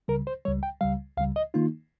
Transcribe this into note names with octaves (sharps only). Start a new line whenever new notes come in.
C#2 C#3 G3 A#4
C5
C#2 C#3 G3 C#5
G5
C#2 C#3 G3 F5
C#2 C#3 G3 F5
D#5
D#3 A#3 D#4 F4